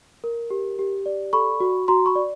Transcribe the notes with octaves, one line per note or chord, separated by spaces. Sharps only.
A#4
G4
G4
D5
A4 B5 C#6
F#4
F#4 A#5 C6
B5 C#6
D5